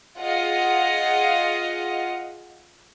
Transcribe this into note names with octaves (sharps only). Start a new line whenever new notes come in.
F4 G#4 D#5 F5 F#5